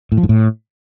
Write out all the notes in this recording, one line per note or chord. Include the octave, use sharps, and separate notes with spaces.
A2
F3
G#2
A2